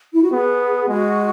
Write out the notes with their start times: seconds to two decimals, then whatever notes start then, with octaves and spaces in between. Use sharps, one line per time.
0.13 E4
0.22 F#4
0.32 B3 G#4
0.88 G#3 F#4